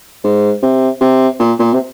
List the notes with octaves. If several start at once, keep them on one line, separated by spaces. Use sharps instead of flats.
G#2
C3
C3
A#2
A#2
C3